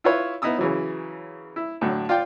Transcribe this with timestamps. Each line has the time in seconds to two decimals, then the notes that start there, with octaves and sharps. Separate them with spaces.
0.04 E4 F4 B4 C#5
0.42 B3 D#4 E4 D#6 E6
0.58 C#3 E3 F#3
1.56 E4
1.81 A2 D3 F#3
2.09 F4 D5 F5 G5